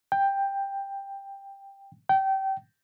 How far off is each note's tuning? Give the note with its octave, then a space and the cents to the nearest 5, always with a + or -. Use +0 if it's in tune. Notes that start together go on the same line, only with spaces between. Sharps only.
G5 +10
G5 -25